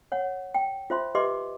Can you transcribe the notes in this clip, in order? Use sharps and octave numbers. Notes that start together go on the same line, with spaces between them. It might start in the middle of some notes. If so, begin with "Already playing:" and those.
C#5 F#5
G5
F4 C5 E5 C6
G4 B4 D#5 E5 C6 D6